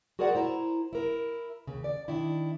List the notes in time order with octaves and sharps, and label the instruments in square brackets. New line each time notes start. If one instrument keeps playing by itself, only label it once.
[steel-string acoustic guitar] F#4 G#4 A#4 C5 D5 F#5
E4 C5 A#5
E4 A#4
D#2 C#3
D5
D#3 D4 E4